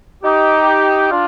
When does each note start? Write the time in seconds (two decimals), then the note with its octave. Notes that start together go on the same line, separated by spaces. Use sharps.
0.23 D#4 G4
1.11 D4 F4